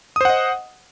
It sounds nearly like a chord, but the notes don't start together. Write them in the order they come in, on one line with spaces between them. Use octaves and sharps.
D#6 C5 F#5 D#5